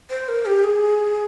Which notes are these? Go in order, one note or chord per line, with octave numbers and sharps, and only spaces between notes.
C5
A#4
G4
G#4